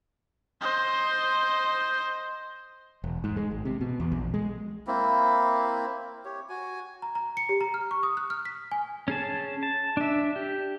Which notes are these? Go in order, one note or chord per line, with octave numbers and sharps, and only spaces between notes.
C5 D#5
E1
G#2
G#3
G#1
C3
B2
E2
A#1
G#3
A#3 C4 E4
G4 C#5
F#4 G#5
A#5
A#5
C#7
G4
A#5
F6
C#6
D#6
F#6
F6
B6
G#5
C#4 G#4 A5
A5
D4 E5
G4